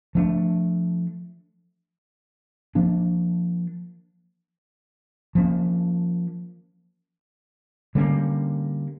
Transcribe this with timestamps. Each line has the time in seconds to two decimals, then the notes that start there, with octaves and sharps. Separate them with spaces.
0.15 F3 A3 D4
2.75 F3 A#3 D4
5.35 F3 A#3 C#4
7.95 D3 G3 A#3 C#4